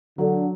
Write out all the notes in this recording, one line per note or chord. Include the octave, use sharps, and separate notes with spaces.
D3 F#3